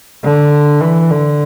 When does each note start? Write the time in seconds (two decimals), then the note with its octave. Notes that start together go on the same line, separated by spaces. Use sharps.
0.24 D3
0.81 E3
1.10 D3